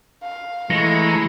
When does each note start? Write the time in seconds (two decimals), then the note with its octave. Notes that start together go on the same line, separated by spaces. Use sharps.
0.23 F5
0.70 E3 G#3 A3 E4 A#5 C#6